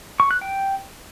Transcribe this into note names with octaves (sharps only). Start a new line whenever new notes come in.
C#6
F#6
G5